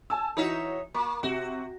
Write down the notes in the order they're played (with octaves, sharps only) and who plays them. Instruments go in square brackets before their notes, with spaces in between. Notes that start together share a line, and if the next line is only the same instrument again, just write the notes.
[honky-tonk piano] G#5 A5 E6
[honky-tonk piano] E3 F#4 [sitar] D#4 C#5 E5
[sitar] A#3 [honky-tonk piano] C#6
[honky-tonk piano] C3 [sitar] F#4